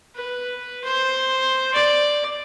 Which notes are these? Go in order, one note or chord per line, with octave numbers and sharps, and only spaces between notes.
B4
C5
D5